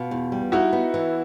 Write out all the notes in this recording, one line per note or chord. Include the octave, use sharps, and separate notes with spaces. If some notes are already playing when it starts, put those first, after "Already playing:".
Already playing: B2 F4
E2
G3
D#4 E4 F#4
B3
E3